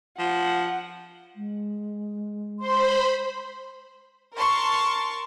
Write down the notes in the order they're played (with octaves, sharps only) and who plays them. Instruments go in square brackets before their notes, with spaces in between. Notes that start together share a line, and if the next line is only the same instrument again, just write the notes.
[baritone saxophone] F3 [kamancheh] F#5
[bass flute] G#3
[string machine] C5 B5 [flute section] C6
[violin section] A#4 A5 C6 C#6